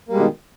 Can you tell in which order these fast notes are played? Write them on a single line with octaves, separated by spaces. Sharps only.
A#3 G3 G#3 B2 D#3